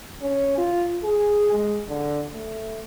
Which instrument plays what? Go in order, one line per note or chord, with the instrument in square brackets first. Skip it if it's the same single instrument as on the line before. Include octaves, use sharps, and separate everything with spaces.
[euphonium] C#4
F4
G#4
G#3
D3
A3